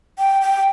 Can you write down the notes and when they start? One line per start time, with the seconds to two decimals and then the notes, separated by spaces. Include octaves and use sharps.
0.19 G5
0.41 G5